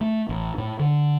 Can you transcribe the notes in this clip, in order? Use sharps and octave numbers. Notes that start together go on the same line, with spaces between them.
A3
A1
A2
D3